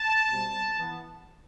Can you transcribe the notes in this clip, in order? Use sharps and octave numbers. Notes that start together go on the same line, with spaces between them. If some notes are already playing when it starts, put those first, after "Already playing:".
Already playing: A5
B2 G3 C4
E3 B3